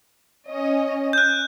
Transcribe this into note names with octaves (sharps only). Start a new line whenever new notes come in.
C#4 D#5
F#6 G6